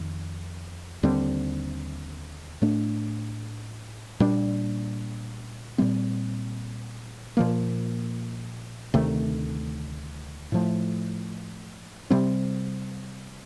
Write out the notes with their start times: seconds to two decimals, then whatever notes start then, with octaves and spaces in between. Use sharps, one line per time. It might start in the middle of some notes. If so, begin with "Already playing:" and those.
Already playing: F2 D#3
1.03 D#2 D3 G3 C4
2.62 A2 A3 D4
4.20 A#2 G3 D4
5.78 A#2 G3 C4
7.37 A#2 F3 A#3
8.94 D2 C3 D#3 A3
10.52 A2 F3 A3
12.11 C3 G3 C4